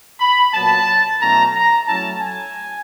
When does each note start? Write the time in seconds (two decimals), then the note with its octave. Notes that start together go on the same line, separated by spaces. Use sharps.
0.20 B5
0.54 A#2 F#3 B3 A5
1.21 B2 F#3 A3 C#4 E4 A#5
1.54 A#5
1.87 F#3 A3 C#4 E4 A5
2.21 G#5